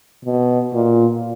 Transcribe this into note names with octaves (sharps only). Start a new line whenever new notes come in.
B2
A#2